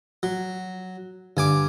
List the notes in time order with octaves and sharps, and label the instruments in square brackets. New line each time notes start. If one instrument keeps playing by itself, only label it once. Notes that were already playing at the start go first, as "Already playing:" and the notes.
[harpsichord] F#3
[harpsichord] G2 G#5 D6 [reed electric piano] D3